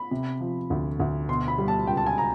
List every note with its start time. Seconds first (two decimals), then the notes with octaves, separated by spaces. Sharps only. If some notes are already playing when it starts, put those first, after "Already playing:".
Already playing: B5
0.11 C3
0.41 F3
0.70 D2
0.99 D2
1.29 B2 C6
1.48 B5
1.58 G3
1.68 A5
1.87 C#2 G5
1.97 A5
2.06 G#5
2.18 A#5